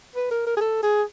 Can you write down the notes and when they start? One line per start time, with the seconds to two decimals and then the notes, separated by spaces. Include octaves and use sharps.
0.16 B4
0.31 A#4
0.46 A#4
0.57 G#4
0.61 A4
0.83 G#4